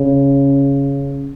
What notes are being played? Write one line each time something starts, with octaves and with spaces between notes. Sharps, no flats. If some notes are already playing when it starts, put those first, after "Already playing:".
Already playing: C#3